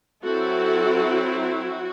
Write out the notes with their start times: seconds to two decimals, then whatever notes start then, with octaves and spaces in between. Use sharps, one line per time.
0.23 F#3 C4 E4 F#4 A4
1.42 F#4